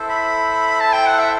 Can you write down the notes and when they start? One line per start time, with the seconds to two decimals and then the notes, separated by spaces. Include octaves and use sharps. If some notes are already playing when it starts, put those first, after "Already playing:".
Already playing: E4 A4 C5
0.09 B5
0.80 A5
0.93 G5
1.06 F#5
1.19 E5